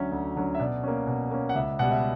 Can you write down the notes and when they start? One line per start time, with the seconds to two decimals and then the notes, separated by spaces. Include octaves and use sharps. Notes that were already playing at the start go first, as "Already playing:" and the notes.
Already playing: D2 D3 F#3 C#4 E5
0.11 D2
0.35 D3 F#3 C#4
0.55 E5
0.59 B2 D5
0.83 A#3 C#4
1.07 B2
1.31 A#3 C#4
1.49 F#5
1.55 C#2 E5
1.79 B2 G3 F#5
1.91 E5